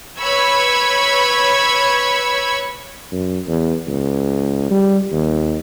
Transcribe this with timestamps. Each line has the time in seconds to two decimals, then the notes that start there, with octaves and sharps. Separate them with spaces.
0.20 B4 C#5 B5 C#6 E6 G#6
3.12 F#2
3.48 E2
3.87 C#2
4.70 G3
5.12 D#2